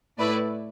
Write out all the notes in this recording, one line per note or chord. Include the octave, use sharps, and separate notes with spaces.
A2 A3 E4 B4 D5